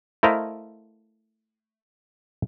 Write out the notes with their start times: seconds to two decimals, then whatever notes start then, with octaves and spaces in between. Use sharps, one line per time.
0.23 A3 E4 A#4 C5 D#5 F5